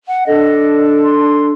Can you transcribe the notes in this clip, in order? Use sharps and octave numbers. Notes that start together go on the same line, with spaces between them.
F#5
D4 A4 D#5
C6